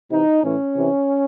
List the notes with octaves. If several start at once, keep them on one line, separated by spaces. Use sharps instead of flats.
C3 E3 D#4
A2 E3 C#4
C3 E3